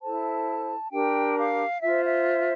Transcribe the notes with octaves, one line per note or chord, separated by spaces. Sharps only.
E4 A4 C5 A5
D4 G4 A#4 G5
F5
F4 C5 E5
E5